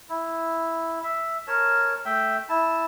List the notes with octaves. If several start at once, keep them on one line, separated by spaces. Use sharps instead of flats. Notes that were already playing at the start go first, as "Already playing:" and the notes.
E4
E5
A#4 C#5 A5
A3 E5 G5
E4 A5